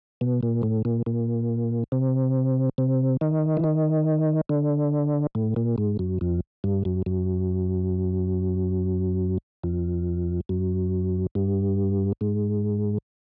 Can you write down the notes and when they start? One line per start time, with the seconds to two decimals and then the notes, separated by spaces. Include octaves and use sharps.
0.21 B2
0.43 A#2
0.63 A2
0.85 A#2
1.06 A#2
1.92 C3
2.78 C3
3.21 D#3
3.57 E3
3.64 D#3
4.49 D3
5.35 A2
5.56 A#2
5.78 G#2
5.99 F#2
6.21 F2
6.64 G2
6.85 F#2
7.06 F#2
9.64 F2
10.49 F#2
11.35 G2
12.21 G#2